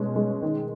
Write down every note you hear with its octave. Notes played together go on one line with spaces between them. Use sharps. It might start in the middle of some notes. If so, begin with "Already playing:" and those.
Already playing: B2 G#3 C#4
G#3
D#3